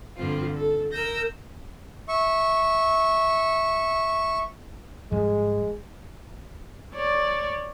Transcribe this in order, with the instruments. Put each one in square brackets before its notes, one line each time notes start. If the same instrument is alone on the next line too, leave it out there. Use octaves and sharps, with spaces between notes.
[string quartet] G2 D3 F3 C4 F4
A4
A#4 E6 G6 A#6
[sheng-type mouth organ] E5 C#6
[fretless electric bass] G#2 F3 G3 [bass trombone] G#3
[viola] C#5 D5